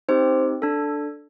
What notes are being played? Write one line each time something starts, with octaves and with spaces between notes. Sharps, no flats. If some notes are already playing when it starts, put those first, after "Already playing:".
C4 D#4 G4 C5
D4 A4